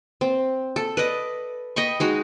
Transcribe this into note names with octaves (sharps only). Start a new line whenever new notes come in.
C4
A4
B4 D5 D#5
D#5 G5 B5 C#6
G#3 D#4 F#4